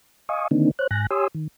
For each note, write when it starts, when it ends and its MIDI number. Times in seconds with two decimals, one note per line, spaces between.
0.29 0.48 75
0.29 0.48 77
0.29 0.48 80
0.29 0.48 85
0.29 0.48 87
0.51 0.71 50
0.51 0.71 51
0.51 0.71 58
0.51 0.71 60
0.51 0.71 62
0.51 0.71 63
0.79 0.87 72
0.79 0.87 73
0.79 0.87 90
0.91 1.07 44
0.91 1.07 80
0.91 1.07 90
0.91 1.07 94
1.11 1.28 67
1.11 1.28 73
1.11 1.28 80
1.11 1.28 84
1.11 1.28 87
1.11 1.28 88
1.35 1.48 51